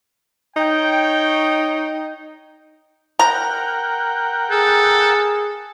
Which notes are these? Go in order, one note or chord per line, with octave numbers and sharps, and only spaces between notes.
D#4 C#5 G5
A#4 F#5 G5 A#5
G#4 A4